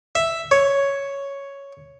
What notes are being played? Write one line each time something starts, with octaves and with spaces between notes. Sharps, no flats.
E5
C#5